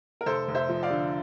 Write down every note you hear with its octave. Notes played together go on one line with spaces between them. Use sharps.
A#4
F1 A4 C5
F1
C5 E5
F3
D5 F5
D3